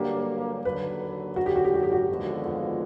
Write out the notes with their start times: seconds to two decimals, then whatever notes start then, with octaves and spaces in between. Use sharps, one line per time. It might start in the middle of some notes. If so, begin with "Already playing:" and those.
Already playing: G2 D3 F#3 A#3 D4 G4
0.65 D#2 D3 F#3 B4
1.36 F#4
1.46 G4
1.56 F#4
1.64 G4
1.74 F#4
1.83 G4
1.92 F#4
2.09 D#2 D3 F3 G#3 B3
2.46 F4